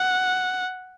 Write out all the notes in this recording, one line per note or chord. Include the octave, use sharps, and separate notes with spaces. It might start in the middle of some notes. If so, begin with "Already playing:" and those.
Already playing: F#5